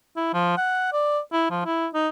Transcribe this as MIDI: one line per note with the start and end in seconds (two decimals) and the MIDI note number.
0.17 0.32 64
0.34 0.54 53
0.57 0.92 78
0.93 1.19 74
1.33 1.45 64
1.50 1.65 53
1.65 1.87 64
1.94 2.09 63